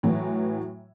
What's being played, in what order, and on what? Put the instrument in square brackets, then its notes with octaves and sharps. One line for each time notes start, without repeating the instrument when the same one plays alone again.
[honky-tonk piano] A2 E3 F#3 F#4